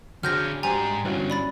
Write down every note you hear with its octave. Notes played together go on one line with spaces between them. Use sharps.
D3 F#3 C4 D4 G#4 F6 G6 A#6
G#2 G3 A#3 C5 G#5 A#5
G2 D3 E3 C#4 F#4
D5 B5 A6